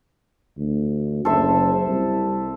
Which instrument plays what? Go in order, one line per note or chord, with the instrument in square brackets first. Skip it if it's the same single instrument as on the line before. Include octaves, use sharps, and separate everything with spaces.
[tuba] D2
[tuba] F#1 [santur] A4 C5 E5
[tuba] C2